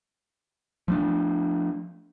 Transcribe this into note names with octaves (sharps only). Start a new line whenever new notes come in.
F3 A3 D4